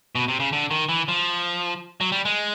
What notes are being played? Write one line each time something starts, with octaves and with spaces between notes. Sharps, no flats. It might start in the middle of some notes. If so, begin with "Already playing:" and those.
B2
C3
C#3
D3
D#3
E3
F3
F#3
G3
G#3